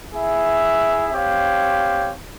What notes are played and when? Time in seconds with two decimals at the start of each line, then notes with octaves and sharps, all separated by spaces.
0.12 E4 G#4 E5
1.12 C4 G4 C#5 F5